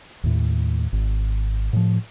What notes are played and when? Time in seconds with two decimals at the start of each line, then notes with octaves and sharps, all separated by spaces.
0.24 D#2 A2
0.93 G#1
1.73 A2 F3